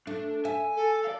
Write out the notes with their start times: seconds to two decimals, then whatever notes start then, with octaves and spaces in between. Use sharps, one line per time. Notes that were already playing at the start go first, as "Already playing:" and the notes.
0.07 A3 D4
0.45 E5 G#5
0.76 A4
1.05 D5 F5